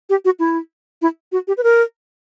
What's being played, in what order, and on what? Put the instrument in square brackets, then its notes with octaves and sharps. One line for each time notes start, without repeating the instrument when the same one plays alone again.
[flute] G4
F#4
E4
E4
F#4
G4
B4
A#4